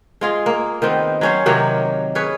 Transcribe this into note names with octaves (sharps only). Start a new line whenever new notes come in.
G#3 F4 G#4
A#3
D#3 B3 C4
F#3 C#4 C5
C3 D#3 F#3 A#3
C#4 G#4 B4 C#5